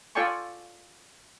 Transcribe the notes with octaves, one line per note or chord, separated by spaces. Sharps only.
F4 A4 D5 G5 G#5 C#6